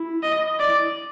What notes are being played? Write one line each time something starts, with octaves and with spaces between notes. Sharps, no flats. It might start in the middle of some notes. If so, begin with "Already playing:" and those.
Already playing: E4
D#5
D5